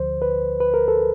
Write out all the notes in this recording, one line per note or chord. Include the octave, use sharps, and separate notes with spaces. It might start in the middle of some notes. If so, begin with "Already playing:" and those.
Already playing: D2 D3 F3 C5
B4
B4
A#4
A4